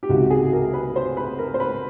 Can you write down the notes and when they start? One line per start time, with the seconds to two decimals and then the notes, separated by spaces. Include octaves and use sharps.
0.03 G4
0.09 C#2 C3 D#3 F#4
0.30 G#4
0.53 A#4
0.73 B4
0.96 C5
1.17 B4
1.39 A#4
1.54 C5
1.60 B4